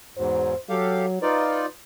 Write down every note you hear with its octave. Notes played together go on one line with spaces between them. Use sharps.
E2 G#2 F#3 C5
F#3 G4 A4 F5
D#4 F4 B4 D5